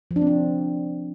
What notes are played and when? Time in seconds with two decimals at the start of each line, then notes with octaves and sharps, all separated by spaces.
0.11 F3
0.16 D4
0.21 C4
0.27 D4